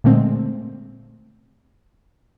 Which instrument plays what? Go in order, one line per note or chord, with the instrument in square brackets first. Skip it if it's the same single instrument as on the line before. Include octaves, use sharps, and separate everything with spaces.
[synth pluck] A#2 D3 G#3 A3 C4